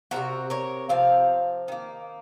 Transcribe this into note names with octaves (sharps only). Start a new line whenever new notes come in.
C3 F3 C4 F#4 A#4
A#4 C#5
C3 F3 C4 F5
D#3 A#3